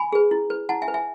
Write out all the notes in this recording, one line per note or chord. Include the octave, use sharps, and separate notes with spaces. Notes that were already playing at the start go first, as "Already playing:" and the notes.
Already playing: G#5 B5
G#4 B4
E4
B4
E4 F#5 A5
E5 G#5
B4
E5 G#5